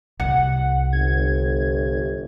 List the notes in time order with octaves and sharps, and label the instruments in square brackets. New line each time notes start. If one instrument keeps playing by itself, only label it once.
[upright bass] C2 [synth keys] F#5
[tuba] G1 [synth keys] G#6